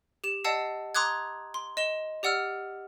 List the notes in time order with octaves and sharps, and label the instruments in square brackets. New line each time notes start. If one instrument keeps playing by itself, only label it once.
[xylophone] G4 E7
D5 D#5 F#5 A5 E6 C7
A#5 C6 D6 D#6 F#6 G#6
C6
D#5 E7 G7
G4 D5 F#5 E6 F6